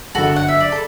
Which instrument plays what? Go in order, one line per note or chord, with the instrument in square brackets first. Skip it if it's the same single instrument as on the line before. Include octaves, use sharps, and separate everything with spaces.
[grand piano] G1 F#2 D3 [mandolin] F#4 A4
[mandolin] F#5
E5
D5
A4